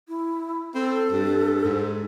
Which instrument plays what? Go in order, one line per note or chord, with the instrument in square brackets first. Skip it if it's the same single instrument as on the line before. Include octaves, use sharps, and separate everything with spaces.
[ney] E4
[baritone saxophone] C4 [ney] A4
[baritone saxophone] G2
G#2